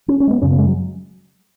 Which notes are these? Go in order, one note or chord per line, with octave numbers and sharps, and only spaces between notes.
C#4
C#4
G#3
B3
F#2 C#3 C#4
B3
G#3
F#3